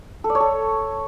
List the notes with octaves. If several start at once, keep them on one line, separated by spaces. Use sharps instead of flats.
A4
D5
C#5
A4